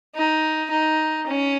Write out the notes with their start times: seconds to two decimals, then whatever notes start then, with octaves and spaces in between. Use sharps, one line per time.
0.16 D#4
0.70 D#4
1.26 C#4